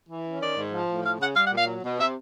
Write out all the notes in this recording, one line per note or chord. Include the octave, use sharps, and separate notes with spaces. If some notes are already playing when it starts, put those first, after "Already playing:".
E3
C#4
D#3 D5
G#2
F3
A2
F3 F5
C#3 F#5
G3 F5
F#5
A#2
F5
F#3
B2
C3 E5